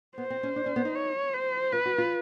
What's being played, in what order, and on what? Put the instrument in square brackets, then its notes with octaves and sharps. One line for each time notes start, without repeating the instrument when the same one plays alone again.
[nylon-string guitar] B3 [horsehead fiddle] C5
[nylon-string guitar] C4
C#4
D4
C#4
B3
D#4
[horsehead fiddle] C#5
C5
[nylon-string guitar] F4 [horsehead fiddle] B4
[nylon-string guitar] F#4
F4